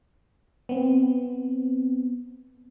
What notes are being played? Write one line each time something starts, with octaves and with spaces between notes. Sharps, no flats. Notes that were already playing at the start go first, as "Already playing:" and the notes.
B3 C4